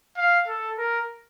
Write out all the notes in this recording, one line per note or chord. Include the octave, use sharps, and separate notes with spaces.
F5
A4
A#4